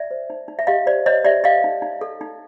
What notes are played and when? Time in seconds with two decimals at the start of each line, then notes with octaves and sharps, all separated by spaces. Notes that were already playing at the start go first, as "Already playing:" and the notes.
Already playing: D5 E5
0.11 C5
0.30 D#4
0.48 D#4
0.59 E5
0.67 G4 D#5 F5
0.86 C5 D5
1.06 C5 C#5 D#5
1.25 G4 D5 E5
1.44 A4 D#5 F5
1.64 D#4
1.82 D#4
2.01 A4
2.21 D#4